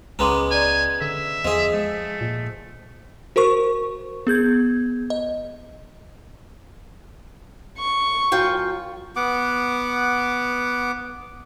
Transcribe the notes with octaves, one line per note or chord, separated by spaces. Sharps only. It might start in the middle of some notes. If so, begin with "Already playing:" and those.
C#2 G#3 B3 C#4 A#5 C6 D6
D5 G#5 A#5
D3 E5
E2 F3 G#4 D#5
G#3 A3
A#2
F#4 A#4 C5 C#6
B3 G#4 G6 G#6
D#5
C#6
F#2 F4 G5
B3 F#5 D6